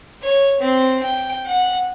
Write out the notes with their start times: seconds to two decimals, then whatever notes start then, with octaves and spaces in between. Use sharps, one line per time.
0.23 C#5
0.60 C4
1.03 G5
1.46 F#5